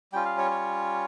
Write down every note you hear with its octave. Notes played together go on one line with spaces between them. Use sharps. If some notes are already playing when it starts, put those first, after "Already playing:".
G3 C#4 F4 G5
F5
C#5
C#5